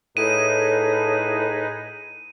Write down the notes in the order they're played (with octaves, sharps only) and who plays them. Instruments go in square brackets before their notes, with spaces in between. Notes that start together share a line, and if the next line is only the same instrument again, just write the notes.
[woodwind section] A2 [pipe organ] D#4 G#4 B4 [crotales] D#7